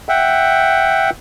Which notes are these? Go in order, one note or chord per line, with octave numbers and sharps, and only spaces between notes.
E5 F#5 G5